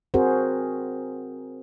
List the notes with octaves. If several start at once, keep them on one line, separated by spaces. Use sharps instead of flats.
C4 F#4 G#4 A#4 C5